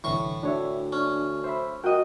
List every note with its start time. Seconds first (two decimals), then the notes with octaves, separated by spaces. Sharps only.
0.04 C2 A2 D3 E3 C#6
0.43 D2 D4 C#5 E5
0.92 C#4 D4
1.44 C5 E5 B5
1.84 F#4 A#4 D#5 G5